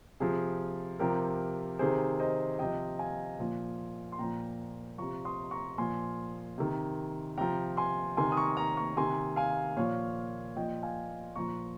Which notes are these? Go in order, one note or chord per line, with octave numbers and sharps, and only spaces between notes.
C3 F3 G#4
C3 F3 G4 A#4
C3 D#3 G#4 C5
C5 D#5
C3 F3 D#5 G5
F5 G#5
A#2 F3
C6
A#2 F3 G5 A#5
C3 F3 A#5 C#6
C6 D#6
A#5 C#6
A#2 F3 G#5 C6
C3 D#3
C3 F3 G5 A#5
G#5 C6
C3 D#3 G#5 C6
D#6
A#5 C#6
A#5 C#6
A#5 C#6
C3 D#3 G#5 C6
F5 G#5
A#2 F3 C#5 F5
A#2 F3 D#5 G5
F5 G#5
A#2 F3 A#5 C#6